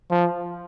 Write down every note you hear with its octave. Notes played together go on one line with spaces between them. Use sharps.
F3